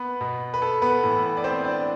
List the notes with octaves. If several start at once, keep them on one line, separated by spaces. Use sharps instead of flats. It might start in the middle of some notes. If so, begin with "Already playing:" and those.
Already playing: B3 B4
B2
B4
A4
B3 B4
A2 E3
D5
C4 C5
D4 D5